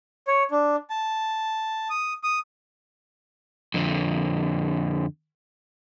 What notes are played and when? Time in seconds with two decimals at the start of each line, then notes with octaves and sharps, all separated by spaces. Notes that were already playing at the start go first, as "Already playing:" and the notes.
0.28 C#5
0.51 D4
0.90 A5
1.90 D#6
2.23 D#6
3.74 F2 D3